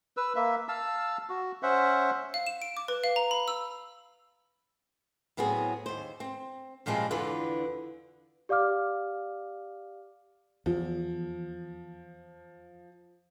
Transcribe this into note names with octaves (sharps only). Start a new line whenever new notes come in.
B4 E6
A#3 E5
F5 A5 E6
F#4
C#4 C5 E5 F#5
F5
E7
D7
D6
B4
F5
A#5
B5
E6
A2 F#3 B3 C4 G#4
D#2 C5
C4
A#2 F3 G3 G#3 B3 C4
E2 D3 F4 B4
G4 D5 F5 D6 F6
E2 F3